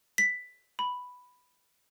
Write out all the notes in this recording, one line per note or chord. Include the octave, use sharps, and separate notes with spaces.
B6
B5